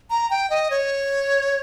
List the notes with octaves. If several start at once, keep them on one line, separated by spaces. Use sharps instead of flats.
A#5
G5
D#5
C#5